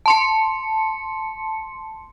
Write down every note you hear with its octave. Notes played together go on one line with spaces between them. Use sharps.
A5 C6 C#7